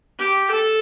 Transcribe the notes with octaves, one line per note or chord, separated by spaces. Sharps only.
G4
A4